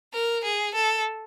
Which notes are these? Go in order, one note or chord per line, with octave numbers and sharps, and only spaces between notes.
A#4
G#4
A4